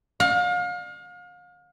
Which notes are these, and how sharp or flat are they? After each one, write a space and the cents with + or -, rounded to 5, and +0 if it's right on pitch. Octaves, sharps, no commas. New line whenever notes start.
F5 +35